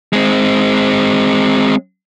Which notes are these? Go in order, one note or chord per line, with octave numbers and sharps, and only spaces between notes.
G#3 C4